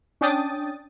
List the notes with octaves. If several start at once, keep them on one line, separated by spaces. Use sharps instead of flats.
C#4 D4 G5 D#6 A6